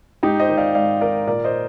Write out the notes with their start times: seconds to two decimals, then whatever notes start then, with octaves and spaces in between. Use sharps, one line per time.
0.23 G#2 D#4 G4
0.40 C5 D#5
0.49 D#3
0.58 D5 F5
0.75 G#2 D5 F5
1.01 D#3 A#4 D5
1.27 A#2 A#4 D5
1.44 C5 D#5